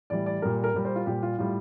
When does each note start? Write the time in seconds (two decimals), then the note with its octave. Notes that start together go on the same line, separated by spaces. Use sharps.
0.10 A2 E3 G3 D5
0.26 D5
0.42 A#2 G3 A#4
0.64 A#4
0.74 A#2 G3
0.85 C5
0.96 F4
1.06 A#2 G3 G4
1.23 F4
1.38 A2 G3 F4